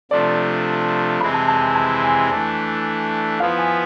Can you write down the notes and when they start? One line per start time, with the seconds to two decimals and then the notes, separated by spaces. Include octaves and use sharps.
0.11 C3 F3 A3 D4 D5
1.21 C3 E3 G#3 C4 E4 B5
1.34 A5
1.48 A5
1.62 G#5
1.75 A5
2.03 G#5
2.30 E3 A3 D4
3.40 F3 B3 E4 F5
3.58 G#5